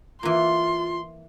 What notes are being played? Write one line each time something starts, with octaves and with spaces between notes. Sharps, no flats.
E3 A#3 F4 C6